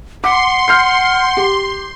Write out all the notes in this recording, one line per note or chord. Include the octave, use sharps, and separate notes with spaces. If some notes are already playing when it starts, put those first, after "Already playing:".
F#5 C6 D6 B6
F6 G6 C7
G4